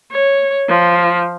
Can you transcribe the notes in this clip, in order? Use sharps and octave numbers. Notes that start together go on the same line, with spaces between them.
C#5
F3